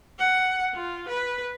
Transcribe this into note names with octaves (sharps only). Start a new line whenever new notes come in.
F#5
F4
B4